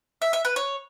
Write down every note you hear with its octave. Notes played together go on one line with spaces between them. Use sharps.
E5
E5
B4
C#5